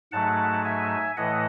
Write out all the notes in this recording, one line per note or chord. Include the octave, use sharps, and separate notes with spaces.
G#2 F#3 A3 F#5 A5
E5 G#5
A2 E3 A3 D#5 F#5